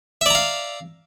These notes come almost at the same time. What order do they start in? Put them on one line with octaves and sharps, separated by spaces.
E5 D5 A#5 F5